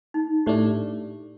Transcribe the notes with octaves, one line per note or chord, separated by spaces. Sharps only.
D#4
A2 A3 D4 G4